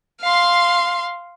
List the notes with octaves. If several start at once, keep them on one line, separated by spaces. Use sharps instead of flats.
F5 C6